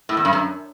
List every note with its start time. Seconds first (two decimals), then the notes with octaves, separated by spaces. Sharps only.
0.09 A2
0.17 E2
0.25 G2
0.33 F#2